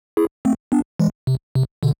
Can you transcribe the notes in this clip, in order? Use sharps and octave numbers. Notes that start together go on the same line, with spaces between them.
E4 G#4
A3 C4
B3 D4
E3 G#3
C3
C3
B2 D3